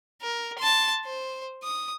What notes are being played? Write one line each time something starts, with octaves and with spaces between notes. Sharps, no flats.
A#4
A5 C6
C5
D#6